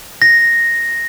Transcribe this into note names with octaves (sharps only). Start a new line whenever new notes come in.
A#6